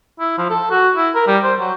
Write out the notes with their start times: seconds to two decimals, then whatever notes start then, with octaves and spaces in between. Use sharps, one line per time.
0.19 E4
0.38 F3
0.50 A4
0.71 F#4
0.96 E4
1.15 A#4
1.27 G3
1.43 C5
1.60 F#3